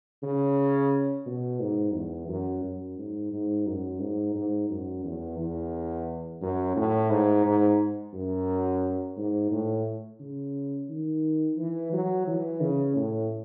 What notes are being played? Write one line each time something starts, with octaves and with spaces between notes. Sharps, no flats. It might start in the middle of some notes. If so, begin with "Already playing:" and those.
C#3
B2
G#2
E2
F#2
F#2
G#2
G#2
F#2
G#2
G#2
F#2
E2
E2
F#2
A2
G#2
G#2
F#2
G#2
A2
C#3
D#3
E3
F#3
E3
C#3
A2